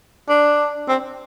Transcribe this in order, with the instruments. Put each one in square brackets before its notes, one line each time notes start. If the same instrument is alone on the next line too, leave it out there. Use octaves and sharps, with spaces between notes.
[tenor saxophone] D4
C4